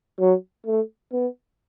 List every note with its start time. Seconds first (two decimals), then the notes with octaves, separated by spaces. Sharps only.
0.20 F#3
0.66 A3
1.13 B3